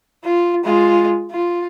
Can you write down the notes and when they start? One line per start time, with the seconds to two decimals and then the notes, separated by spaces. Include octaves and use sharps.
0.24 F4
0.64 G#3 F4
1.31 F4